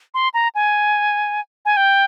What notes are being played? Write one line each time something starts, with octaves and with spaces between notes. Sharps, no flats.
C6
A#5
G#5
G#5
G5